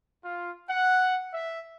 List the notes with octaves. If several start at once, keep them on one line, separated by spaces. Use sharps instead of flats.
F4
F#5
E5